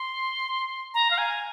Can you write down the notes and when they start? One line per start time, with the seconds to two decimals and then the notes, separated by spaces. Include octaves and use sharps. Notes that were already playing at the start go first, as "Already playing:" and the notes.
Already playing: C6
0.94 A#5
1.11 F5
1.18 G#5